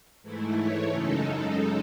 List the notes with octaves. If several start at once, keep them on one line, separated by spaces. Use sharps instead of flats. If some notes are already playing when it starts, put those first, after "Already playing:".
G#2 E3 A3 E4
C#5
F#2 C#3 G#3 D#4 A4